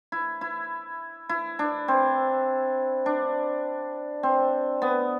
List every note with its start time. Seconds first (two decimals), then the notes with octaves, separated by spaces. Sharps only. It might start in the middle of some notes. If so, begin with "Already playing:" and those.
0.12 E4
0.41 E4
1.29 E4
1.59 D4
1.88 C4
3.06 D4
4.23 C4
4.82 B3